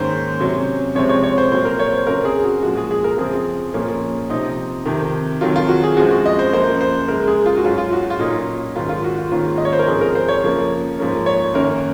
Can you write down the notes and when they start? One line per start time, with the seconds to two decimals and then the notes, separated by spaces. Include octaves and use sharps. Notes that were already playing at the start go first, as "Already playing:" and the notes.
Already playing: G#2 D#3 A#3 C#4 C5
0.40 C3 F#3 C#4
0.95 C3 F3 G#3 C4 C#5
1.09 C#5
1.23 C#5
1.38 C5
1.51 A#2 F#3 C4 C5
1.65 A#4
1.79 C#5
1.93 C5
2.07 F#2 C#3 F#3 C4 A#4
2.25 G#4
2.44 F#4
2.62 A#2 F3 G#3 F#4
2.77 G#4
2.91 G#4
3.04 A#4
3.18 F#2 C#3 F3 C4 G#4
3.74 A#2 F3 A#3 C#4
4.30 C3 F3 C4 D#4
4.85 F2 C3 D#3
5.41 F2 D#3 F#3 F4
5.56 F4
5.69 F#4
5.83 G#4
5.97 F#2 F3 G#3 C4 F#4
6.11 F#4
6.26 D#5
6.39 C5
6.53 F#2 F3 A#3 C5
6.81 C5
7.08 F#2 C#3 G#3 A#4
7.27 G#4
7.46 F4
7.57 F#4
7.64 G#2 F#3 C#4 F4
7.78 F4
7.92 F#4
8.10 F4
8.19 A#2 F#3 A#3 C#4 D#4
8.75 G#2 D#3 F#3 F4
8.89 F4
9.04 F#4
9.18 F4
9.32 G#2 D#3 A#3 C#4 F4
9.58 D#5
9.65 C#5
9.73 C5
9.79 A#4
9.87 G#2 F3 C4 G#4
10.01 A#4
10.15 C5
10.28 C#5
10.44 F#2 C#3 F3 A#3
10.99 G#2 F3 A#3 C#4
11.26 C#5
11.54 F#2 D#3 A#3 C#4 A#4